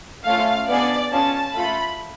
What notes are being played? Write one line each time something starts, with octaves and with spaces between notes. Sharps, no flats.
A3 C#4 F4 F5
B3 D4 G#4 D5
C#4 F4 G#4 A5
A3 F4 A4 B5